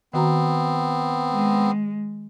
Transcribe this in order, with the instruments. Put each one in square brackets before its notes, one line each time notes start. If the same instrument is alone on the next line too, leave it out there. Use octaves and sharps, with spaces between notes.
[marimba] D#3 F#4 A#5 [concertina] B3 C4
[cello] G#3